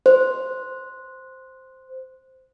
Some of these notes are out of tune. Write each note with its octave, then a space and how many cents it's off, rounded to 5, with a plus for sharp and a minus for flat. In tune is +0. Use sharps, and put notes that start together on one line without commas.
C5 -5